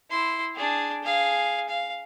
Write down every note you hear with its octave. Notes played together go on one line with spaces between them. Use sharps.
E4 C6
D4 G#4
G#4 F5
F5